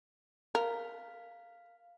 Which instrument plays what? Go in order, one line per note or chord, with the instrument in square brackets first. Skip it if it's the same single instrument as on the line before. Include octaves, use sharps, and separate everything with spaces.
[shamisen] A#4 [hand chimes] F5